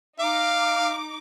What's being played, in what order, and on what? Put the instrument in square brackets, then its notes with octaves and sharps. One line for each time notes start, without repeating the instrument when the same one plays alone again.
[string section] D#4 D6 [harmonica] F5